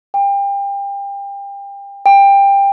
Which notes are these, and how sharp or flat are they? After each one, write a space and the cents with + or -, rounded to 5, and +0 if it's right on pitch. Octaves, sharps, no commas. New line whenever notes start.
G5 +30
G5 +20